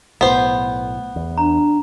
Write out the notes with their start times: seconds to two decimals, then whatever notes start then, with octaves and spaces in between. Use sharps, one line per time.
0.21 B1 A2 B3 C5
1.16 E2
1.38 D4 A#5